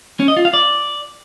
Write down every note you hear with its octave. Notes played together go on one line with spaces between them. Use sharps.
C#4
D#5
F4
F5
D5